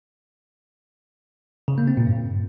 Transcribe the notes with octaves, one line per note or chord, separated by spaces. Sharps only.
C#3
A#3
C4
A#2
G2